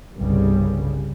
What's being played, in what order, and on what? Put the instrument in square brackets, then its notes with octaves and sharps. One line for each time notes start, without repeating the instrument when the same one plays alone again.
[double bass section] G1 C2 G2 C#3 G3